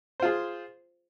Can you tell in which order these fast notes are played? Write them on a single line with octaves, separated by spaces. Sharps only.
C5 F4 G#4